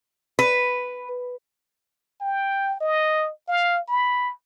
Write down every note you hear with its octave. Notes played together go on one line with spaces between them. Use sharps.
B4
G5
D#5
F5
B5